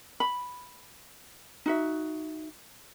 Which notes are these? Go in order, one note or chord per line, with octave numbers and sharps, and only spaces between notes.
B5
D#4 F#4 E5